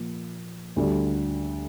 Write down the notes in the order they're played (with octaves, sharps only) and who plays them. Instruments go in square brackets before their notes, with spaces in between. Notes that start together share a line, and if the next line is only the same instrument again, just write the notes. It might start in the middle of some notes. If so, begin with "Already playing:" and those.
Already playing: [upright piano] A#2 F3 A#3
D2 D3 G3